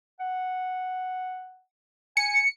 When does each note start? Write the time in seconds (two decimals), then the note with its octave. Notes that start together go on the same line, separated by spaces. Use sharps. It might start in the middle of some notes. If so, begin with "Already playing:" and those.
0.20 F#5
2.17 G#5 C#7